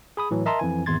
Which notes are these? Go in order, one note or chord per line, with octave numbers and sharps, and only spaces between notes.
G#4 B5 D#6
A2 E3 F#3
A#4 D#5 E5 A5 A#5 C6
F2 E3 G#5
G#1 E2 C6 G#6 A6